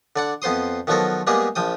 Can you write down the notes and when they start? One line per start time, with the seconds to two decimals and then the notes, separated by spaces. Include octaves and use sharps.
0.16 D3 D5 F#5
0.42 F2 B3 C5 C6 D#6
0.87 D#3 F3 F#3 B3 A4 A#4
1.27 G3 G#3 A#3 B3 G4 G#4
1.55 A#1 F3 G5 D#6